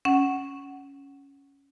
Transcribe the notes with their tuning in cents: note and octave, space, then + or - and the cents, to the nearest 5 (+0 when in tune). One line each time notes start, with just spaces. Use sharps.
C#4 +5 F#5 +10